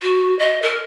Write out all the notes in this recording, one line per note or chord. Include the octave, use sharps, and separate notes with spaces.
F#4
D#5
A#4